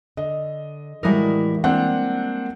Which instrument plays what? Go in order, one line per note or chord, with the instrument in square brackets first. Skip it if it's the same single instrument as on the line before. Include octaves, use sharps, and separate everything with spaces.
[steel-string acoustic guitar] D3 [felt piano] D#5
[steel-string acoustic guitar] A2 E4 F#4 [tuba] E3 [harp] G3 G#3 A#4
[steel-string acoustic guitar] A#3 [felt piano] C4 D4 F#5